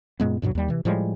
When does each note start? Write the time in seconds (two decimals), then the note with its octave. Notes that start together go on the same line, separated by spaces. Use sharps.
0.20 F#2 A#2 G#3 B3
0.42 D2 G2 B2 F#3
0.55 D#2 G3
0.68 C3 E3
0.85 A2 F3 G3 G#3